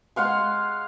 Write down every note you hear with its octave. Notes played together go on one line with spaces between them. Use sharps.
G#3 F5 F#5 C6